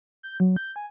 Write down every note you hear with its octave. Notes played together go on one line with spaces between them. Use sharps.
G6
F#3
G6
G#5